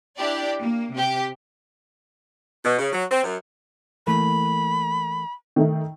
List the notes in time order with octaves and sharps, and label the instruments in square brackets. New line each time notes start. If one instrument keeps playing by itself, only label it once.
[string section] D4 E4 G4 D5
A#3
C3 G4
[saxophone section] B2
C#3
F#3
C4
F#2
[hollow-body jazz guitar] E3 A3 A#3 [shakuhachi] B5
[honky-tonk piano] D#3 A3 D#4